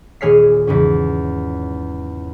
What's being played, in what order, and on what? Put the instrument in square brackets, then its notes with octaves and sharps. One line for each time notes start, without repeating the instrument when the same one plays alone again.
[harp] D#1 G#4 C#5 F6 B6 C7
E2 G#2 C#3 C#4